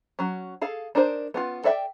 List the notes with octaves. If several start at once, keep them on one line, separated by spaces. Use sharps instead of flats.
F#3 C#4
G#4 A4 F5
D4 D#4 A#4 C5
B3 C#4 F4
A4 D5 E5 G5